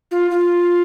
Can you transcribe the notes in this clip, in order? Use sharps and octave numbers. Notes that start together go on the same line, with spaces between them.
F4
F4